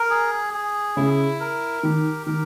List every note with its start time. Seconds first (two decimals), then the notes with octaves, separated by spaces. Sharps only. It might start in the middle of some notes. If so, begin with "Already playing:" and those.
Already playing: A#4
0.10 G#4
0.54 G#4
0.96 C#3 E4
1.40 A#4
1.83 D#3 G4
2.26 D#3 A#4